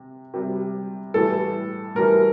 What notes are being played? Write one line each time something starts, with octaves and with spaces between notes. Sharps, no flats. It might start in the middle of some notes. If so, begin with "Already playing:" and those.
Already playing: C3
C3 G3
A2 E3 G3 A4
A2 E3 G3 A#4